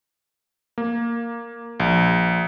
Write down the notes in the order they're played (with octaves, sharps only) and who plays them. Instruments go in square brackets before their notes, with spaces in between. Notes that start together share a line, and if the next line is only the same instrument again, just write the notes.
[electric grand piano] A#3
A#1